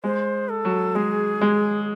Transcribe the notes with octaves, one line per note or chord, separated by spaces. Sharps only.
G#3 C5
A4
F#3
G#3 G#4
G#3